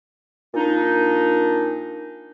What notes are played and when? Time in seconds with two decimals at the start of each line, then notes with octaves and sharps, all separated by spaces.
0.54 A#2 D4 D#4